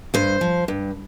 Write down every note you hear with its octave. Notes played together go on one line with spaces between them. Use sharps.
G2 C5
F3
G2